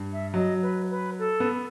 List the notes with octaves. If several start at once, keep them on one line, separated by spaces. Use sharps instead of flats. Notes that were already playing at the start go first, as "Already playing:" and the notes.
Already playing: G2
E5
F#3 D#5
B4
B4
A4
B3